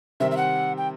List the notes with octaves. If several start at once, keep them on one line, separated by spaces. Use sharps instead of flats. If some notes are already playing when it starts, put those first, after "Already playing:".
C3 D#3 G3 C4 E5
E5
F#5
G5